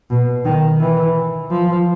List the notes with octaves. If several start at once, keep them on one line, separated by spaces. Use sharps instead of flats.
B2
D#3
E3
F3